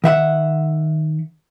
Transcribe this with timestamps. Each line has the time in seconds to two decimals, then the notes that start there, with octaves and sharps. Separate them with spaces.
0.04 D#3 E5 F#5